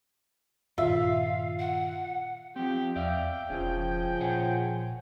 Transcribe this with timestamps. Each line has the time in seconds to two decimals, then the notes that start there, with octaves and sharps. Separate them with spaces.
0.78 G2 A#2 D#3 F4 E5 F5
1.59 F#5
2.56 F3 C4 G4
2.96 E2 D5 E5 F5 G5
3.50 E1 C#3 F3 C#4 G#4
4.20 A#2 C#5 F#5 G#5